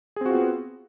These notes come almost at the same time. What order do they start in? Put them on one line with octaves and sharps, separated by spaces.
G#4 C4 F#4 F4 B3